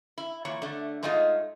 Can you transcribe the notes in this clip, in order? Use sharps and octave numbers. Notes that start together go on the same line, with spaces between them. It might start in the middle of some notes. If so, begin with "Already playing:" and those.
E4
A#2 E3 C#5
D3 A3
G#2 G#3 A3 D#4 F4